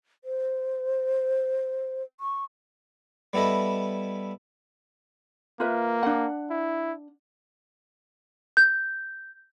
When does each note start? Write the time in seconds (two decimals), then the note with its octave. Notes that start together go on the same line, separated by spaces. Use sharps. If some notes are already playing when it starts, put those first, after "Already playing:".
0.24 C5
2.20 C#6
3.33 G3 B3 E4 A4 D#5
5.60 A#3 F4 B4 E5
6.03 D4 F#5
6.50 E4
8.57 G6